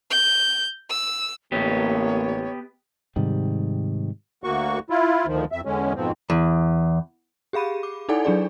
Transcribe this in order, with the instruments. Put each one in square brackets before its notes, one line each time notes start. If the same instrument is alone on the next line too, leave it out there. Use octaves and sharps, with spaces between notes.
[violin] G6
E6
[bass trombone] A1 [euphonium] A#3 [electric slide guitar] B3 G4 [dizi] C#5
[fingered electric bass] G#2 C3 D#3 G3
[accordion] D2 A#3 F#4 C#6
E4 F4
D2 D#3 F3
F2 E5
E2 D3 G#3 C#4
F2 G#2 B2 F3 C4
[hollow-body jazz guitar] E2
[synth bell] G4 G#4 F5 B5 D#7
D6
D#4 E4 A4 D5 F#5 G#5
F#3 D4 G#4 D5